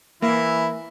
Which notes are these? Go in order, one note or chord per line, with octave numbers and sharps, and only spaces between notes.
E3 A#3 E4